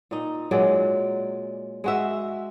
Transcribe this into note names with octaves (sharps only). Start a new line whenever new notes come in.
A#2 D#4
A#2 F#3 G#3 D5
G#3 F#4 E5